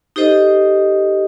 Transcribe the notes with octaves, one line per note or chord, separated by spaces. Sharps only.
D#4 G4 A4 C5 D#5